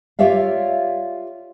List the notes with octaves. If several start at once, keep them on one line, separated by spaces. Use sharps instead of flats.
F4 G4 C#5 D5 E5 F5